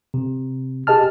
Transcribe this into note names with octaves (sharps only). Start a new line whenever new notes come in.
C3
G4 G#4 D#5 A5 F6